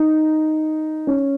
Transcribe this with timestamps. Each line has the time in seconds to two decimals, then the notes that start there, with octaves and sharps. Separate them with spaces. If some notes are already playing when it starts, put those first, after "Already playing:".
Already playing: D#4
1.07 C#4